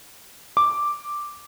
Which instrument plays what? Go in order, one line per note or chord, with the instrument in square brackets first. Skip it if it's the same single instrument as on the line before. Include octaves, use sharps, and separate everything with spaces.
[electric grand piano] D6